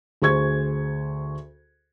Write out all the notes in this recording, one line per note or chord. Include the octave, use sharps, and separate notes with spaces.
D2 G#4 C5 C#6 G#6